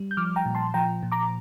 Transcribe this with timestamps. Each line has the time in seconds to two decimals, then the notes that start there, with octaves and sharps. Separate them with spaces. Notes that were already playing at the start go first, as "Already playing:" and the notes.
Already playing: G3
0.11 G6
0.17 F3 D6 F6
0.36 G5 A#5
0.46 A#2
0.55 A5 C6
0.74 F3 G5 A#5
1.03 A#2
1.12 A#5 D6